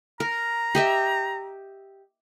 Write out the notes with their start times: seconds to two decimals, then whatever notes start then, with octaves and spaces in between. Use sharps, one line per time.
0.20 A#4 A#5
0.75 G4 D#5 E5